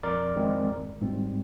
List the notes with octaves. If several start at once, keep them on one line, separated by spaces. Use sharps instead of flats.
F2 A#4 D5
D#3 G#3 C4
G#1
G#2 G3 C4